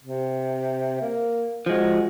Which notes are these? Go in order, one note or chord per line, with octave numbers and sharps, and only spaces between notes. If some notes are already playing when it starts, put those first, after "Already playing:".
C3
A#3
F3 G#3 F#4